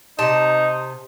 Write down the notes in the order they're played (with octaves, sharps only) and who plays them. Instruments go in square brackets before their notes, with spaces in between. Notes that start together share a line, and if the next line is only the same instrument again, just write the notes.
[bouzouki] C3 A5 [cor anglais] D#4